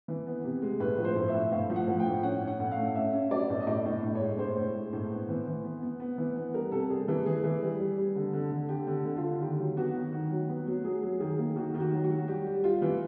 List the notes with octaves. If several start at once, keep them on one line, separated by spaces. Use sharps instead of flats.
E3
B3
C3
G#3
A2 B4
F3
C5
A2
E5
A2
A2 F5
F3
F#5
F3
G5
A2
C#4 F#5
C#4
F#5
A2
F5
A3
C#4 E5
C#4
F#3 D5
A2
D#5
A2 D5
A2
A2
C#5
G#3
A2 C5
A2
G#3
A2
B3
E3
E3
B3
B3
B3
E3
B3
G3 A#4
C3 A4
G3 G#4
E3 A4
E3 G#4
E3
G3
G3
G3
D3
D3
D3
D3 G4
D3
D3
F4
D3
D#3 G4
F#3
B3 F#4
D#3
D#3
F#3
B3
F#3
F#3 G#4
F#3
D#3 G#4
A#3
D#3 F#4
D#3
F#4
F#3
F#4
F#3
G3 G4
G3
G3 F4
E3